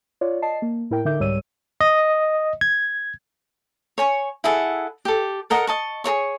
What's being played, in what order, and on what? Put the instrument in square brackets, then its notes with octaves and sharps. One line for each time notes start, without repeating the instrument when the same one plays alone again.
[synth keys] F4 C#5 D5
D#5 A5 C7
A#3
A2 E4 A#4 G5
D3 D#4 A#4 E5 D6 G6
C2 G#2 G3 C#5 E6 D#7
[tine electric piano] D#5
G#6
[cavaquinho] C#5 G#5 C#6
E4 G#4 A4 F#5
G4 A4
A4 A#4 D#5 F#5
D#5 A5 C#6
G#4 A#4 C#5 C#6